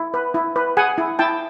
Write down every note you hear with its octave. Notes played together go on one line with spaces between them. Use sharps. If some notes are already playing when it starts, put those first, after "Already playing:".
Already playing: E4
B4
E4
B4
G#4 F#5 G#5
E4
E4 G5 A5